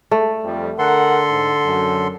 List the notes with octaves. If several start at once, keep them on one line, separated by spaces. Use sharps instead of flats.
A3
F2 G3
D3 A4 A#4 F#5 C6
G#2
F#2